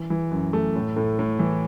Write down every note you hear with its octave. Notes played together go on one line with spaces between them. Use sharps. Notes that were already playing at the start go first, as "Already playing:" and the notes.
Already playing: E3
E3
F#2
A3
A2
A2
A2
E3